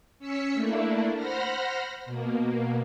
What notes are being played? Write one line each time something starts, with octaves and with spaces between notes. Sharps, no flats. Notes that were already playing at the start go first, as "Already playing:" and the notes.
C#4 E6 B6 C#7
A3 A#3 D4 E4
C5 F#5 B5 F6 A#6
B2 A#3